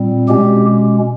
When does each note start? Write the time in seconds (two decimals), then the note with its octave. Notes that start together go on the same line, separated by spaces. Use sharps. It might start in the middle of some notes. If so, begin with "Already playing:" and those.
Already playing: A#2 G3 C4
0.28 B2 G#3 C#4 G4